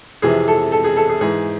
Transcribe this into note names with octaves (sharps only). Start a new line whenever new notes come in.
F2 C3 E3 G#4
A4
A4
G#4
A4
G#4
G#2 E3 G#4